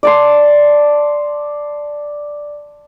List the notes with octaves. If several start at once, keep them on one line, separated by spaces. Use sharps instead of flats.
D5 A5 C6